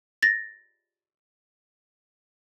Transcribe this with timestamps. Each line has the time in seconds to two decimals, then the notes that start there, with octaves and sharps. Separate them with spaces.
0.23 A6 A#6